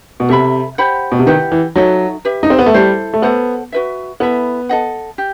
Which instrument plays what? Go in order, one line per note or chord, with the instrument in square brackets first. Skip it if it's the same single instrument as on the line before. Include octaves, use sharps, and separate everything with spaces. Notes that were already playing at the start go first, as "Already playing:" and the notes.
[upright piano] B2
[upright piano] C3 [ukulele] A4 E5 B5
[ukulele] G4 C5 F#5 B5
[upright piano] B2
C3
[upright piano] D#3 [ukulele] E4 G4 B4 F#5
[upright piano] E3
[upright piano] F#3 [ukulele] D#4 F#4 A4 E5
[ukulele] G4 B4 E5
[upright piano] D#4
C4
B3
A3
[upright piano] G3 [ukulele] E4 A4 C5
[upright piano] A3
[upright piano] B3 [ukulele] A4 C5 F#5
[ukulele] F#4 B4 E5
[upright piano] B3 [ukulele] E4 A4 E5 B5
[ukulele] A4 D#5 F#5
G4